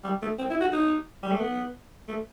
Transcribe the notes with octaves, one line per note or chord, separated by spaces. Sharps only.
G3
A3
C4
E4
F#4
D#4
G3
A3
B3
A3